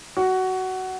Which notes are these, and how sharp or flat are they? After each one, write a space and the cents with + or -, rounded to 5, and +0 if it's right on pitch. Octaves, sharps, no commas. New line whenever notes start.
F#4 +15